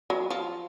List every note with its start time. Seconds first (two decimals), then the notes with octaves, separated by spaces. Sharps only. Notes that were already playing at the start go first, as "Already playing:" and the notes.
0.10 F#3
0.30 F3